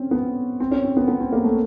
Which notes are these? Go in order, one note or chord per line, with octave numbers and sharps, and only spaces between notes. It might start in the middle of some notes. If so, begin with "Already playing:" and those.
Already playing: C4 C#4
B3
C4
C#4
C4
B3
B3
C4
A#3
A3